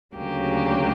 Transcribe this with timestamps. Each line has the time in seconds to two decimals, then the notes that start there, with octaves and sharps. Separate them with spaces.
0.15 D2 C#3 F#3 A#3 G4